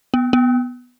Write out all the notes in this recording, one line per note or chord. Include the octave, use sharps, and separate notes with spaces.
B3
B3